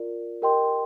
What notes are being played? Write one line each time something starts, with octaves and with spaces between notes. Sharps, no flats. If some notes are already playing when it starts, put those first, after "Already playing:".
Already playing: F4 A#4 D5
G4 A#4 D#5 G5 C6